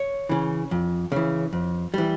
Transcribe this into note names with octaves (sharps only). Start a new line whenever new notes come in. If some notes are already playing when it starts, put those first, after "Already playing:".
Already playing: C#5
C#3 E3
F2
C#3 E3
F2
E3 G3